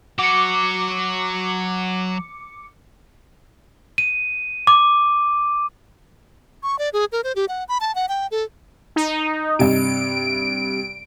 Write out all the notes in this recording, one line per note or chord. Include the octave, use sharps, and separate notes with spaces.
F#3 F#4 D6 C#7
D#7
D6
C#6
D5
G#4
A#4
C5
G4
F#5
B5
A5
F#5
G5
A4
D#4
G2 C3 D7